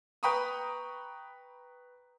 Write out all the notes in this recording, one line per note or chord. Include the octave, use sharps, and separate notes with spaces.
B4 G5 A#5 B5 C#6 D#6